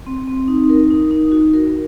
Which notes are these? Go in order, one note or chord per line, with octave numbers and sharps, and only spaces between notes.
C4
C4
D#4
A#4
D#4
D#4
F#4
A#4